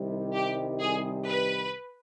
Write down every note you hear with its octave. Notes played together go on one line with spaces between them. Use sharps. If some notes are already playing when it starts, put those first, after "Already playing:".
Already playing: C2 C3 D#3 G3
G4
G#4
B4